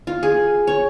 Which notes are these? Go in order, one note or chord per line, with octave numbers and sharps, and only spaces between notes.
F4
G#4
C#5